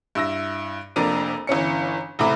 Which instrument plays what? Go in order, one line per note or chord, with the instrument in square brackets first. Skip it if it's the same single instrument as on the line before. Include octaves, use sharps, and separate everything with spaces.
[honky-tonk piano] G2 E4 E6 A#6
F1 F2 A#3 D4 A#4 D#7
G1 E3 C#4 C#7
F#1 C2 A2 E4 B5 D6